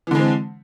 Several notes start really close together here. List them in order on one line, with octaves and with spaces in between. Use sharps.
E3 D3 G#3 C4